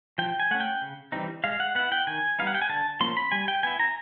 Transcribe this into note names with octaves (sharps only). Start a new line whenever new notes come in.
F3 G5
G#5
A3 C#4 F#5
G5
C#3
E3 G3 C4 D#4
G#3 F5
F#5
B3 E4 F#5
G5
D#3 G#5
G3 B3 D#4 F5
F#5
G5
G#5
D3 A5
F3 A#3 C#4 C6
B5
G3 G#5
G5
B3 E4 G#5
A#5